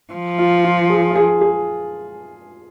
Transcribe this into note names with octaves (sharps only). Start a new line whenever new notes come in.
F3
F4
F4
G#4
F4
G#4
G#4